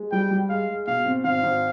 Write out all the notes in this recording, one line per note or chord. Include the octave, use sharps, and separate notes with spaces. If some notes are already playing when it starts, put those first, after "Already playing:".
Already playing: G#3
G3 G5
G3
G#3 F5
G#3
B2 F5
C4
G#1 F5
G#1